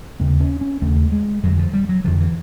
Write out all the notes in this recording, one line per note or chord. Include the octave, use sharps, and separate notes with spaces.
D#2 C#3 A#3
C#4
C#4
D#2 C#3 A3
G#3
F2 D3 F#3
F3
G3
F#3
F2 D3 F3
E3